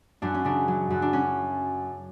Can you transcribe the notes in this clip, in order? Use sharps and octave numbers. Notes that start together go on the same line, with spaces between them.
F#2 D4
C#4
C#3 D4
F#3
F#2
D4
C#4